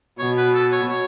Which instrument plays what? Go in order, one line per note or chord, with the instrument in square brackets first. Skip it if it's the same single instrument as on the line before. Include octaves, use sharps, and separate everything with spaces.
[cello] B2 [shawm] C#5
[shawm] B4
A4
C#5
C#5